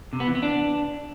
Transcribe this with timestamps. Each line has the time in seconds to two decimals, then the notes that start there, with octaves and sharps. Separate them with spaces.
0.13 C3
0.20 B3
0.28 E3
0.35 B3
0.43 D4